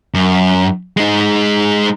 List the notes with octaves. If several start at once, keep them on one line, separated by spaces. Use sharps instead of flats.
F#2
G#3 D#4